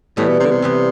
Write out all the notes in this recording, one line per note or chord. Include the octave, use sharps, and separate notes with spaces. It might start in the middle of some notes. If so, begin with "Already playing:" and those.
A2 E3 G3 B3
B2
C3
D3
C3
E3 G3 B3